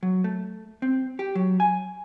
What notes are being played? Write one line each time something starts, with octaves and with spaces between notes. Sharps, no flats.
F#3
A3
C4
G4
F#3
G#5